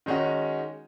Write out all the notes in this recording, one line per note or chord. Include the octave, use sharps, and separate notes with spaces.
D#3 G#3 C#4 D#4 F#4